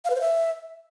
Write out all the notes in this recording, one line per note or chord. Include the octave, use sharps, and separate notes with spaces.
F5
B4
C5
E5